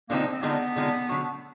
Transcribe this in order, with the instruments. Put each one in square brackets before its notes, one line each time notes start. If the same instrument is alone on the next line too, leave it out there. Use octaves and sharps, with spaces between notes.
[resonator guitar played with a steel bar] D3 F3 G#3 C4 D#4 [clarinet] A#3
[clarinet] C4
[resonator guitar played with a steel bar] D3 F3 G#3 C4 D#4 [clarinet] B3
[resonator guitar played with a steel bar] D3 F3 G#3 C4 D#4
D3 F#3 A3